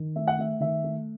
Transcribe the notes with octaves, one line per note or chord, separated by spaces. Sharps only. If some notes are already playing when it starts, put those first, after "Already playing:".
Already playing: D#3
A3 E5
F#5
A3 E5
D#3 E5
A3